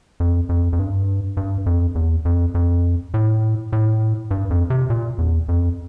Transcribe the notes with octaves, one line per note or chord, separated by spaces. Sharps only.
F2
F2
F2
G2
G2
F2
E2
F2
F2
A2
A2
G2
F2
C3
A#2
E2
F2